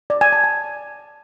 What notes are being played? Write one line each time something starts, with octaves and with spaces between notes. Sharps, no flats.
D5
G#5
A5
A5